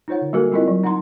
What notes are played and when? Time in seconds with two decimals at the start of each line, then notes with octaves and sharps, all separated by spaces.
0.08 D#4 F4 C5 C#5 F#5
0.21 D3
0.33 G3 A#3 F#4 A4 A#4 G#5
0.52 G3 C4 E4 F4 A#4 D#5
0.68 F#3
0.84 D#4 F#5 A5 A#5 C6